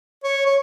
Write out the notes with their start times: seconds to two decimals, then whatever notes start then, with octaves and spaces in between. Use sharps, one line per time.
0.24 C#5
0.46 C#5